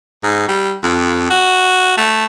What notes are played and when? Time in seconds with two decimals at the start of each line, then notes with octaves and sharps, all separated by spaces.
0.24 G#2
0.48 G3
0.84 F2
1.30 F#4
1.97 A3